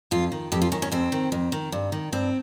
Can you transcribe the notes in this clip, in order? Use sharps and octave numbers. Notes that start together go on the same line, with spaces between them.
F2 F4
D#3
F2 G4
F4
D#3 C#4
C#4
F2 C4
D#3
F2
D#3
G2
D#3
G2 C4